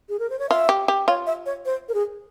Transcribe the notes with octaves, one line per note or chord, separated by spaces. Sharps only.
G#4
A#4
C5
C#5
F4 E5
G4
G4
F4 C#5
E5
C#5
C5
A#4
G#4